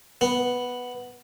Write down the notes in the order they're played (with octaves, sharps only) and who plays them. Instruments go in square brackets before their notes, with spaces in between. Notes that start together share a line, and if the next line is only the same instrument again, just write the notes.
[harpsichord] B3